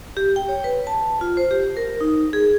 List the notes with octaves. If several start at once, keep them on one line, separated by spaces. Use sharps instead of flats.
G4
G5
C#5
B4
A5
F4
C5
G4
A#4
D#4
G#4